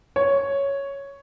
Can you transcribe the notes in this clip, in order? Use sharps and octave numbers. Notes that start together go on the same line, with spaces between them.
C#5